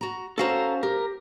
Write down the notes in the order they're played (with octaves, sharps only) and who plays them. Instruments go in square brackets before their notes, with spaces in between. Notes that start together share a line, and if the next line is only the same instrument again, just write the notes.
[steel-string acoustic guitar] F#4 A#5
[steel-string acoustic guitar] C#4 F#4 C5 [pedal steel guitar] A4 F5 A#5
[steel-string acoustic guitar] G4 [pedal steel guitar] A#4